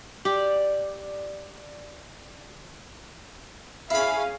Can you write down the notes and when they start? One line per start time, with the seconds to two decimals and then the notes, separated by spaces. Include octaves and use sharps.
0.25 G4 D5
3.90 C#4 E4 G#4 F5 B5